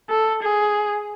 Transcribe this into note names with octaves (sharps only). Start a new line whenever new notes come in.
A4
G#4